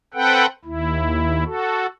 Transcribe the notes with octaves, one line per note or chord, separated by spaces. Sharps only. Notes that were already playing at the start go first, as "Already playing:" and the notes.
C4 A4 B4 F#5 G5
D#2 E4
F#4 A4